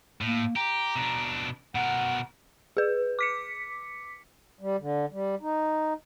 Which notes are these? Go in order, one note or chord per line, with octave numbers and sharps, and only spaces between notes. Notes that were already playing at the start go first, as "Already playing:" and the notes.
A2 A#3
G4 A#5
B2 D4
B2 A#4 F#5
G#4 B4
D6 B6 C#7
G3
D3
G3
D#4